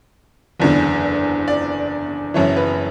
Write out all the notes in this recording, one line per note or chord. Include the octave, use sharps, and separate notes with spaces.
F#1 E2 D3
D5
F#1 F#2 E3 C#5
B4